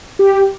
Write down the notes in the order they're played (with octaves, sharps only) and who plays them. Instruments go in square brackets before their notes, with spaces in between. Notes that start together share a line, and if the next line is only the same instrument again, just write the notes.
[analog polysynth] G4